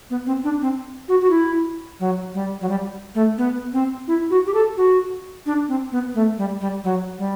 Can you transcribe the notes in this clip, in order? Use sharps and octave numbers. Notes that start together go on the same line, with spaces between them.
B3
C4
D4
C4
F#4
F#4
E4
F#3
G3
F#3
G3
A3
B3
C4
E4
F#4
G4
A4
F#4
D4
C4
B3
A3
G3
G3
F#3
G3